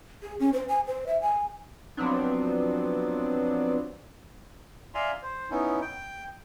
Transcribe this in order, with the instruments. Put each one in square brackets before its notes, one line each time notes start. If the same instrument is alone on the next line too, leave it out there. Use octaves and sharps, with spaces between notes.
[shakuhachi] G#4
C#4
C5
G#5
C5
E5
G#5
[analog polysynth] F3 F#3 B3 C4 D4
[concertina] D5 E5 F5 G#5 A#5 C6
C5
B3 C#4 D#4 E4
G5